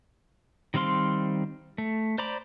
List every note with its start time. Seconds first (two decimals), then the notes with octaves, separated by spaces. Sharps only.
0.74 D#3 G3 C4 F5 C6
1.78 A3
2.18 C5 D5 A#5 B5 D6